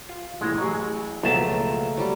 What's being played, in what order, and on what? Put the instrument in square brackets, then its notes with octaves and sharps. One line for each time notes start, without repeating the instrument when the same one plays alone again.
[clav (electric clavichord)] F4
[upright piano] A1 A2 A#6 [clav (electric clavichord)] G#3
[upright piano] A1 G#4 [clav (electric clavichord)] F#3
[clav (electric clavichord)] C#2 A5 [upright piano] B2 F3 F#3 [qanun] A3 A#3
[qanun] F#3 G3